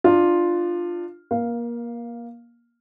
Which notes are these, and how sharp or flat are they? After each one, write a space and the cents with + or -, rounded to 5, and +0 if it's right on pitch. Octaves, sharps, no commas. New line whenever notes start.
D4 +30 F4 +0
A#3 +25 F5 +0